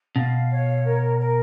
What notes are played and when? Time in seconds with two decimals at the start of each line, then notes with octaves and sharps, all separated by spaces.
0.16 B2 F5
0.50 C#5
0.84 A#4
1.18 A#4